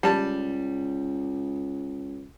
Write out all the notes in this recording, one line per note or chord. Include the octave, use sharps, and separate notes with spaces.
C#2 G3 A5